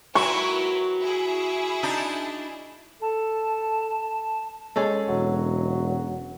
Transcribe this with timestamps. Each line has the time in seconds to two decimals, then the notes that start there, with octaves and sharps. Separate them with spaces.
0.15 F#3 E4 A#4 B4 C#6
1.01 E4 G#4
1.83 D4 D#4
3.02 A4 A5
4.76 G#3 C#4 A4
5.08 E1 F#3